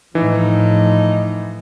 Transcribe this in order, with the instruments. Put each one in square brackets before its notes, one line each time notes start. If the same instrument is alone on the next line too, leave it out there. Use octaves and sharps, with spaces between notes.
[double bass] A2 F3 [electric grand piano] E3 [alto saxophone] D#4